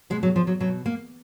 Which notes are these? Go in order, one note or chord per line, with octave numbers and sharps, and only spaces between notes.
B2 G#3
F#3
F3
F#3
B2 F#3
A#3